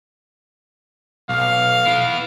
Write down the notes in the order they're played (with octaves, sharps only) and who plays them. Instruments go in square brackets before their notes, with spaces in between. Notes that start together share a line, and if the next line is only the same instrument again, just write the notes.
[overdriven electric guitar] B1 [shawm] F5
[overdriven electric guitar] B3 E4